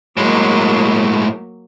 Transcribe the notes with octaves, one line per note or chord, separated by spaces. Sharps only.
A2 F#3 G#3 A#3